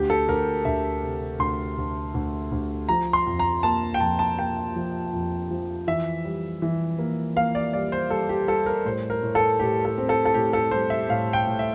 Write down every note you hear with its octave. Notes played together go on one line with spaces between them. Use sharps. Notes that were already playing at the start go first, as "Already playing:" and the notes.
Already playing: D2 G4
A4
D2 A#4
D2 E5
C3
D2 C6
D2
D2
D2
F3 A#5
C6
F2
A#5
A#3 A5
G5
F2 A5
A5
A#3 G5
F3
F2
F3
E3 E5
G3
E3
A#3
A#3 F5
D5
G3 D5
C5
G3 A4
G4
G3 A4
A#4
A2 C5
A#4
A2
A4
A2 G4
A4
C4
A4
A4
A2 G4
A4
G3 C5
E5
A2 F5
G5
A2
E5